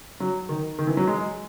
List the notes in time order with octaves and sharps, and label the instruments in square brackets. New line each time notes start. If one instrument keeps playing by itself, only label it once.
[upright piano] F#3
D#3
D#3
E3
F#3
G#3